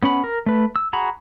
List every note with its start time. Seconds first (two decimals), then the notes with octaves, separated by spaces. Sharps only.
0.03 B3 C#4 F#5 B5
0.24 A#4
0.46 A3 B4
0.76 E6
0.93 F#4 G#4 F#5 A#5 B5